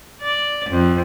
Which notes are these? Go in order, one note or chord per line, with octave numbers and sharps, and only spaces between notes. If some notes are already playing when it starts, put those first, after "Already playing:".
D5
F2